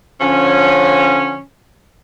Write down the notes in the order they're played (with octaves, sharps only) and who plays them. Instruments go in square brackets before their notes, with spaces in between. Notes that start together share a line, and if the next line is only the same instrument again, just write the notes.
[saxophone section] D3 F3 C#4